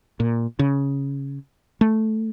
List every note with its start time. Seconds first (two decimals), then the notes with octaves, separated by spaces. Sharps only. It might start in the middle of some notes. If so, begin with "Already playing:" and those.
0.20 A#2
0.59 C#3
1.81 A3